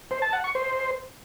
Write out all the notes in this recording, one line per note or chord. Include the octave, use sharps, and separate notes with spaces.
C5
A5
F#5
C#6
C5